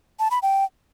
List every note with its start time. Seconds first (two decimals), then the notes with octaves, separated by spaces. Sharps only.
0.19 A5
0.31 B5
0.42 G5